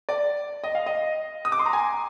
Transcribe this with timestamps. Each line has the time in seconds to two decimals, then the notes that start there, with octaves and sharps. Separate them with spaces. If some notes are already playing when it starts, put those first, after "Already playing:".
0.09 D5
0.64 D#5
0.75 F5
0.86 D#5
1.45 D#6
1.52 D6
1.59 C6
1.66 A#5
1.73 G#5